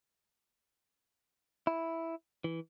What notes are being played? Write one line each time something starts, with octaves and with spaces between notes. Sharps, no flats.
E4
E3